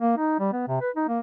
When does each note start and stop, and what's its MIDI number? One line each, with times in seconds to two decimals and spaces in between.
0.01 0.16 58
0.17 0.38 63
0.39 0.48 55
0.53 0.63 59
0.68 0.78 48
0.81 0.90 71
0.96 1.06 63
1.08 1.20 58